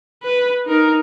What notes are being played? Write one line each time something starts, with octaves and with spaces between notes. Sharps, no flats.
B4
D#4 A#4